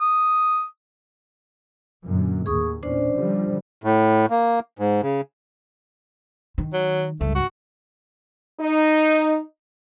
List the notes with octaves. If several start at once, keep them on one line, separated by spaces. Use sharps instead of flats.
D#6
F#2 A#2 D3
D#2 A2 G#4 C#6 D#6
E2 A#2 C#4 D4 C5 D5
D3 F3 G3
A2
A#3
G#2
C#3
D#3
F#3
C#2 G2 A3
F#4
D#4